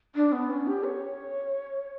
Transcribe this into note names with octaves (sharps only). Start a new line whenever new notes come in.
D4
B3
C#4
G4
C#5